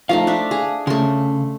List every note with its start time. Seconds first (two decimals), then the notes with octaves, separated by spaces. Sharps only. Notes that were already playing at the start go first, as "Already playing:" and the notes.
0.09 F3 A3 D#4 F5
0.27 D4 E5
0.51 G#4
0.87 C#3 A3 C6